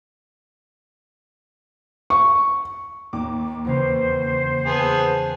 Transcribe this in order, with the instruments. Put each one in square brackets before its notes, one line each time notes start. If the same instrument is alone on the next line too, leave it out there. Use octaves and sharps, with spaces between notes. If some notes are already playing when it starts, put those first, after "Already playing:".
[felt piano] C#6
[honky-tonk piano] D#2 D6
[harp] E2 C#3 C#4 [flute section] C5
[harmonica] B3 G#4 [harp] A5